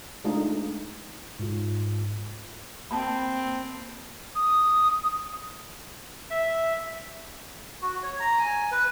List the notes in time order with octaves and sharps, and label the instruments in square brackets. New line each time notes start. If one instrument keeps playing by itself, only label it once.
[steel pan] G#3 A3 D4 D#4 F4
[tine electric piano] G#2 F4
[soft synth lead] A#3 [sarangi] C4 [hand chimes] A5 B5
[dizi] D#6
[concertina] E5
[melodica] F#4
C#5
A#5
G#5
B4